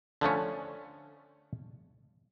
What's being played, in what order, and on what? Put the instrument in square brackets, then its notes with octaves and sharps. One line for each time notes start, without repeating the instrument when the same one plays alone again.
[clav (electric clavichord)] D3 F3 A3 C#4